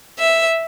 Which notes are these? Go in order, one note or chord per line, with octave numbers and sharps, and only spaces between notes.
E5